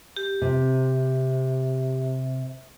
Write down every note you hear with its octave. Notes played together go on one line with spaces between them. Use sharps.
G4
C3